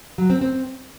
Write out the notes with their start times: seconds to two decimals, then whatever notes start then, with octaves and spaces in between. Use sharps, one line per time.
0.18 F#3
0.30 C4
0.41 C4